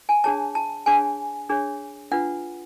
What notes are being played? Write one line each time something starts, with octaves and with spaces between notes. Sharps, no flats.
G#5
D4 G#4 C#5 A5
A5
D4 G#4 C#5 G#5
D4 G#4 C#5
D4 F4 B4 F#5